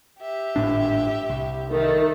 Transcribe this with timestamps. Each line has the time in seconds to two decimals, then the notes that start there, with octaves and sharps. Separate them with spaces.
0.20 G4 E5
0.56 G#1 A2 D4
1.30 C2
1.70 D#3 A3